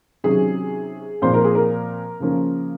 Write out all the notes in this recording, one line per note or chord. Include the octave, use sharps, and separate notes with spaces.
C3 D#3 F#3 C#4 G#4
A#2 F3 C4 C5
A#4
G#4
A#4
C#3 F3 A#3 C#4